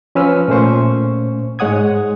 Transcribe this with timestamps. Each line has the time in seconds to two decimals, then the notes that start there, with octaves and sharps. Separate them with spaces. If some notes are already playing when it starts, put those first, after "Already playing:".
0.15 F3 C#4 B4 E6 F6
0.48 A#2 A3 C#4 C5 C#6
1.59 G#2 G#3 C#5 F#5 D#6 G#6